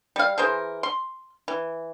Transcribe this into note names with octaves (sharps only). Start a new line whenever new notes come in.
G3 F5
E3 G#4 A#4 C5
C6
E3